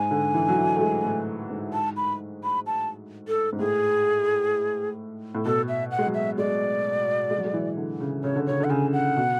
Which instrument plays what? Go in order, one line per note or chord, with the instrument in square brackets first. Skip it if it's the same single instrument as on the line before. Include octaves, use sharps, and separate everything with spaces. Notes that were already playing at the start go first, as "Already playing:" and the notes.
Already playing: [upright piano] G#2 [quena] G#5
[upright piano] D3
E3
F#3
E3
A3
G#3
A2
G#2
[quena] A5
B5
B5
A5
A4
[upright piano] G#2
[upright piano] A2 [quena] G#4
[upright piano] A2
[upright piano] B2 [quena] A4
[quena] E5
F#5
[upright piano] G#3
F#3
[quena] E5
[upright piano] G#3 [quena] D5
[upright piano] G#3
F#3
G#3
E3
D3
C#3
[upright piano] C#3 [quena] C#5
[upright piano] D3
[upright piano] C#3 [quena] C#5
[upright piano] D3 [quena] F#5
[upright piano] C#3 [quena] G#5
[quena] F#5
[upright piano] B2